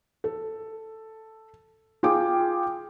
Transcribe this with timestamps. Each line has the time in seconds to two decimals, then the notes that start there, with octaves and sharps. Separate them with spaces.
0.24 A4
2.03 F4 G#4 G5 D6